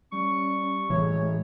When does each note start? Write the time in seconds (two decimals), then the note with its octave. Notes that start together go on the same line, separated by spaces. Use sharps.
0.12 G3 C#4 C#6
0.90 A2 E3 G#3 C#5